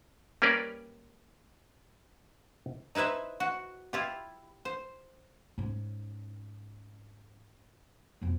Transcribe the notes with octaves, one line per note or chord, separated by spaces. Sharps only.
G3 A#3 C#4 A#4 B4 D5
D#4 E4 B4 C5 E5
F#4
E4 F4 G4
C5
G#2 C#4
B1 F2